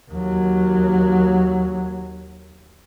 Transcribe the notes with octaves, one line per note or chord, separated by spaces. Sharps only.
D#2 F#3